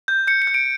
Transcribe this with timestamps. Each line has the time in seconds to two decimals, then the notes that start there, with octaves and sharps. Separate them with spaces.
0.08 G6
0.27 G6 C#7
0.42 C#7
0.47 G6
0.54 D7